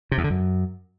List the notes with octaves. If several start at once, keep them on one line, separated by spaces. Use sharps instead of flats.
C3
E2
D3
F#2